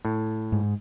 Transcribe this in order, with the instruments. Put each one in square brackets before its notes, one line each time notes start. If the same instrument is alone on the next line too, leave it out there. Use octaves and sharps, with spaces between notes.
[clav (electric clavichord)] A2
[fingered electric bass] G#2